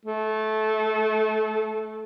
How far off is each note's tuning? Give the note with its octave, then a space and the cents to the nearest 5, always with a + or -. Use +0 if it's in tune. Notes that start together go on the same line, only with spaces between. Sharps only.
A3 -20